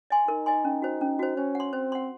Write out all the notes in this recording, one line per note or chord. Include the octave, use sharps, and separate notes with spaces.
D#5 G#5 C6
D#4 A#4
D#5 G#5 C6
C#4
F#4 C5
C#4
F#4 C5
C#4 C5
F#5 C6
C4 C5
F#5 C6